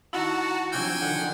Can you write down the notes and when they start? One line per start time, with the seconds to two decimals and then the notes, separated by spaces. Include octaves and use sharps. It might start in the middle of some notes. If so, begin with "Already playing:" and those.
0.13 D#3 D#4 E4 F#4 F#5 A5 A#5
0.72 C3 F3 F#3 D4 F4 G5 G#5 E6
1.01 D3 D#3 F#5